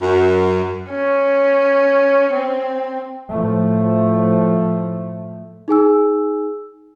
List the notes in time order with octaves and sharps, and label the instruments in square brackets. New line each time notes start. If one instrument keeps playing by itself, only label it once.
[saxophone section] F#2
[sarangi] C#4
C4
[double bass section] A2 F3 A3
[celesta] D#4 G#4 G#5 E6